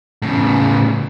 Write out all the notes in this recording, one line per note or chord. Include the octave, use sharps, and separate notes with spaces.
A2 C#3